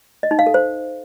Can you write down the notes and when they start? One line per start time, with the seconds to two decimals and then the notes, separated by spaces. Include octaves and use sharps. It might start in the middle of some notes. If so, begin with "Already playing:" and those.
0.23 D#5
0.31 D#4
0.39 F5
0.47 A4
0.54 C5